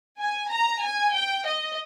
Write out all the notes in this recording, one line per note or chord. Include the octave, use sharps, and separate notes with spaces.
G#5
A#5
G#5
G5
D#5